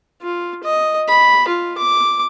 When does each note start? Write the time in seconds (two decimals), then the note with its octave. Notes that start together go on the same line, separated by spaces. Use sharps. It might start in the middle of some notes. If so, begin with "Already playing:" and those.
0.22 F4
0.63 D#5
1.08 B5
1.48 F4
1.78 D6